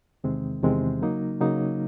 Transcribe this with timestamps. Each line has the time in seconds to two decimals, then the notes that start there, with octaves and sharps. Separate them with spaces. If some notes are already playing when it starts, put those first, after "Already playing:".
0.24 E2 C3 D#3 G#3 C4
0.63 E2 C3 D#3 G#3 C4
1.02 C#3 F#3 A#3 D#4
1.41 C#3 F#3 A#3 D#4